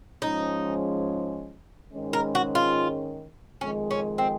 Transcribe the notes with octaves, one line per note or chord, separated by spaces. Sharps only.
G#2 F3 G#3 C#4 D#4
G#2 D#3 G#3 C#4
A#4
F#4
F4
F2 D#3 G#3 C#4
C#4
C4